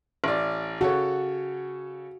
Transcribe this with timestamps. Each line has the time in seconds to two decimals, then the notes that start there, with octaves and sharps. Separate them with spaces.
0.24 A1 D5
0.81 C#3 F#4 A4 C#5